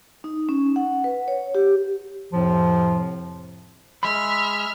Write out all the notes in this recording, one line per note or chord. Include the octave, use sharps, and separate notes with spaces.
D#4
C#4
F#5
B4
C#5
G4
F2 A2 C3 F3
G#3 E5 B5 F6